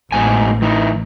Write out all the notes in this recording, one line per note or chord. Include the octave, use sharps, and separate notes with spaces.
A1 G#2 B2 G#5
E3 D#4